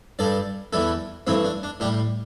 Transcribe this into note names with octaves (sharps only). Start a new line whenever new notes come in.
G2 G3 A4 D5
E2 E3 G3 E4 A4
G2 E3 A3 C4 E4
D4
D4
A2 G3 D4 G4